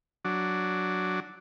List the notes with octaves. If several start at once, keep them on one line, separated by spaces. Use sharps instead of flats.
F#3 D4